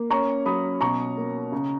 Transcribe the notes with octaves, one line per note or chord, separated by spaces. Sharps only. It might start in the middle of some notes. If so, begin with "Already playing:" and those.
Already playing: A#3
C#4 A#5 C#6
F#3 B5 D#6
B2 A#5 C#6
A#3
C#3